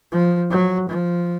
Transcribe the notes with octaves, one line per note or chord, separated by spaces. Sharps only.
F3
F#3
F3